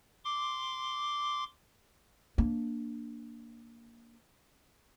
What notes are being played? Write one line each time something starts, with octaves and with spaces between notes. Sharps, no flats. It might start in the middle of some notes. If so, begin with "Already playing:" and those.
C6 D6
A#3 D4